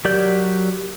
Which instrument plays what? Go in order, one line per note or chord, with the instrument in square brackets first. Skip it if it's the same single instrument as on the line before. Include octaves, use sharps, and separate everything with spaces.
[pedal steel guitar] F#3 G4 A#4 D5 G6